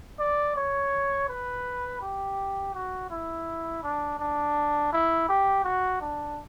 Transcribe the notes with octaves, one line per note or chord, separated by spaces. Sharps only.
D5
C#5
B4
G4
F#4
E4
D4
D4
E4
G4
F#4
D4